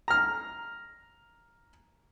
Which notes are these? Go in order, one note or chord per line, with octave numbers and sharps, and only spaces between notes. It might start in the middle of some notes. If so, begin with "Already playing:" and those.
A#5 F6